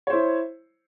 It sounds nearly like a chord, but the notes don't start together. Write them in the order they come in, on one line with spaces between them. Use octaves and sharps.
C#5 C5 E4